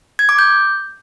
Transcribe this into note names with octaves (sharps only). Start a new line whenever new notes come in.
G#6
D6
G6